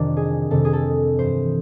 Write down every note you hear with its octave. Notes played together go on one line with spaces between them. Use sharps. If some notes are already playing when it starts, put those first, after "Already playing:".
Already playing: F2 C3 D#3 D4
G#4
F2 C3 D#3 A4
G#4
A4
G2 E3 C5